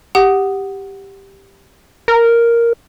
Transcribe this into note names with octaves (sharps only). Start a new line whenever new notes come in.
G4 F#5 D#6
A#4